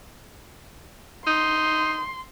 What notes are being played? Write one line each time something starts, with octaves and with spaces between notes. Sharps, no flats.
D#4 C6